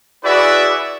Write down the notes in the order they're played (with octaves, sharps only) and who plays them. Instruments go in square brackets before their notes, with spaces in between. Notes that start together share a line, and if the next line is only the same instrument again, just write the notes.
[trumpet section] E4 F#4 G#4 B4 D5 E5